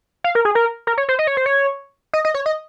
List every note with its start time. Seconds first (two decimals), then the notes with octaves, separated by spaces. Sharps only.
0.24 F5
0.35 A#4
0.45 G#4
0.55 A#4
0.87 A#4
0.98 C#5
1.09 C5
1.19 D#5
1.27 C#5
1.37 C5
1.46 C#5
2.13 D#5
2.25 D#5
2.34 C#5
2.46 D#5